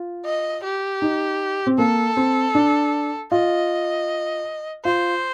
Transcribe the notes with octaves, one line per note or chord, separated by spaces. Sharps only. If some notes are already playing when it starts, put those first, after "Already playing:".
Already playing: F4
D#5
G4
D#4
C4
A#3 A4
C4
D4
F4 D#5
F4 C5